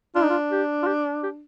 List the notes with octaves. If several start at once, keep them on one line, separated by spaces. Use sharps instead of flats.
D4 F4
D#4
F4
G4
F4
G4
G4